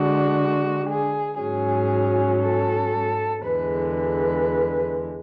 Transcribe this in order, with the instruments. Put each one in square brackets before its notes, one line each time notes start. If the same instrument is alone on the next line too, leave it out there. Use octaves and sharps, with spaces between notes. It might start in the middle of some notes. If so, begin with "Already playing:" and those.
Already playing: [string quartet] D3 G#3 D4 F#4
G#4
G#2 F#3 C#4 G#4
A4
E2 D3 G#3 B4
B4